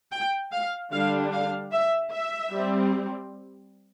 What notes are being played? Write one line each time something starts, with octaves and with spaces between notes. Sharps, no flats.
G5
F5
D3 G3 D4 F5
F5
E5
E5
G3 C4